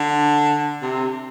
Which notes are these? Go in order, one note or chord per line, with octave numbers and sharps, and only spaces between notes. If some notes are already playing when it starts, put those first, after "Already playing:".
Already playing: D3
C3